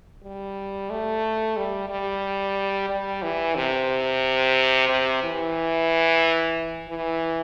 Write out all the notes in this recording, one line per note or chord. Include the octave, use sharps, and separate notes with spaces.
G3
A3
G3
G3
G3
E3
C3
C3
E3
E3